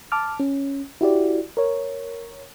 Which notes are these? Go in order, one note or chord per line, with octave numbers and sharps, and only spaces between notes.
A5 D6 F6
C#4
E4 F#4 G4 D5
A#4 C#5